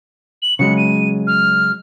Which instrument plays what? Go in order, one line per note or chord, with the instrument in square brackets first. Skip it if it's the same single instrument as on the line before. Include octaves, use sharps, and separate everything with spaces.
[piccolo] F#7
[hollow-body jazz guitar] C#3 F#3 G#3 [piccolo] C#7
[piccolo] D#7
F6